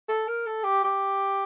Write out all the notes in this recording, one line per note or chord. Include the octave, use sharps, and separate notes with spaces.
A4
A#4
A4
G4
G4